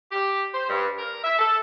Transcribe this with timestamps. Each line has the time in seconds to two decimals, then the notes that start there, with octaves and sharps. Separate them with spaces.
0.12 G4
0.54 C5
0.69 G2
0.98 A#4
1.24 E5
1.39 A4